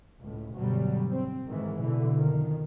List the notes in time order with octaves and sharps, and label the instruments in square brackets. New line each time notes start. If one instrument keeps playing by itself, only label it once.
[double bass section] C#2 A2
D2 G2 B2 F#3 G3
C4
G#2 D#3 E3 G#3
B2 D3 E3
F2 D#3